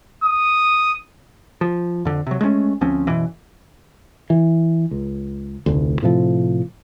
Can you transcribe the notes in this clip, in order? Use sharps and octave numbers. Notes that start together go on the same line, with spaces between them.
D#6
F3
F2 D3
C3 F#3
G#3 A3 C4 C#4
D2 F3 C4 C#4
F#2 B2 E3
E3
C#2
F1 D2
A2 C3 F3